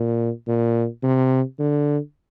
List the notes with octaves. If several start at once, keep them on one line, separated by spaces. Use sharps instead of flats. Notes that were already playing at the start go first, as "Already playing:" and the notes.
Already playing: A#2
A#2
C3
D3